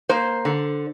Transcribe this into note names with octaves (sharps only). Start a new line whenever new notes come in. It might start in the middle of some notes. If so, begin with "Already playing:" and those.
A#3 C5
D3